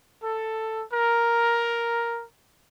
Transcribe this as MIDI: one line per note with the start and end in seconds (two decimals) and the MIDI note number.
0.23 0.85 69
0.93 2.24 70